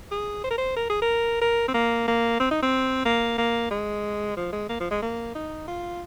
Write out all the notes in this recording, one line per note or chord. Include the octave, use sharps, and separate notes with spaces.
G#4
C5
A#4
C5
A#4
G#4
A#4
A#4
C4
A#3
A#3
C4
D#4
C4
A#3
A#3
G#3
F3
G#3
A#3
F3
G#3
A#3
D#4
F4